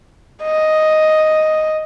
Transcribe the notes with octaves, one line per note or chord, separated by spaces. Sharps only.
D#5